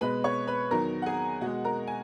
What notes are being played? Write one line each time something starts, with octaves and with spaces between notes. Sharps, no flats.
B2 G#3 B4 B5
C#5 C#6
B4 B5
E2 D#3 F#3 A#4 A#5
F#5
G#4 G#5
B2 G#3 F#4 F#5
A#4 A#5
G#5